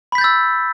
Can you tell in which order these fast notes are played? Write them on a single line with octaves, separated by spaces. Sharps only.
B5 B6 G6 A6 E6